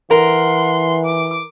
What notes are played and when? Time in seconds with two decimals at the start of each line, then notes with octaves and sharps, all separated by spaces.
0.11 E3 A#4 F#5 C6
1.06 D6